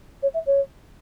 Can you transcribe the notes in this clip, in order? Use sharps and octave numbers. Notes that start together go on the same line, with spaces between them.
C#5
E5
C#5